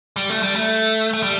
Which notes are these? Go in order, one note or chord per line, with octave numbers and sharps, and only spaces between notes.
G3
A3
G3
A3
A3
G3